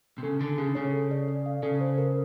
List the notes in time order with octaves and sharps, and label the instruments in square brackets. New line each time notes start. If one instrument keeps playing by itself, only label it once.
[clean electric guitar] C3
[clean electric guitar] C#3 [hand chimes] A4
[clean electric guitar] D3 [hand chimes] D4
[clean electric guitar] C#3 [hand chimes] G#4
[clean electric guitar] C#3 [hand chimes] C#5
[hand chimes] A4
D5
D5
F5
[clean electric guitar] C#3 [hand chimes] A4
[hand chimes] C5
A#4